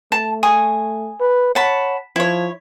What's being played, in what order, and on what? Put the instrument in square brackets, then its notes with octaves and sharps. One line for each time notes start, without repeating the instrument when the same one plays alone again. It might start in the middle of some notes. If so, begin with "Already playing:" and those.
[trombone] A3 [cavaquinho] A5
[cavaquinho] G#5 C#6 D#6
[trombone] B4
[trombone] C#5 [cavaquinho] F#5 A5 B5
[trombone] F3 [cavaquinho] E4 C#5